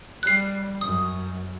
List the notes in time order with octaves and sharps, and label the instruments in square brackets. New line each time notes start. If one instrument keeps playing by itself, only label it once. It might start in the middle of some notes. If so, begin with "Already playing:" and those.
[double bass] G3 [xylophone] F#6 C7
[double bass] F#2 [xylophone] D#6